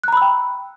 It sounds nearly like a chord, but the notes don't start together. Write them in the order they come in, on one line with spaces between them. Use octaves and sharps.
F#6 A#5 B5 E6 G5